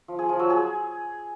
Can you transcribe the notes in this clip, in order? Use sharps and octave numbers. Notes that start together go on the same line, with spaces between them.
F3
G#4
F3
F#3
G#4